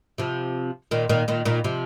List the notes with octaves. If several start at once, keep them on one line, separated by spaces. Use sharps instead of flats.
C3 F3
A#2 D#3
A#2 D#3
A#2 D#3
A#2 D#3
C3 F3